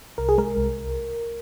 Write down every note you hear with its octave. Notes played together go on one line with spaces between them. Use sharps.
C2 A#4
G#4
G#3 A#4
C2